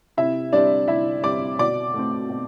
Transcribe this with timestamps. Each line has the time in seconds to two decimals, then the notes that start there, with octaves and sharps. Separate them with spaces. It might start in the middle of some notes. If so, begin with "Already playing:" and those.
0.17 C3 E4 E5
0.53 G3 C4 D4 D5
0.88 C3 E4 E5
1.24 G3 C4 D5 D6
1.59 B2 D5 D6
1.94 A3 C4
2.30 B2